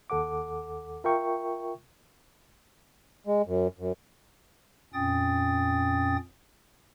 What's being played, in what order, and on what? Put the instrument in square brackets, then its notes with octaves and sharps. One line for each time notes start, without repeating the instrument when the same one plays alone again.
[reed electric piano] D#2 A4 F#5 D6
F4 A#4 E5 G5 C#6
[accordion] G#3
F#2
F#2
[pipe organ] F2 A#2 C#4 G5 D#6 A6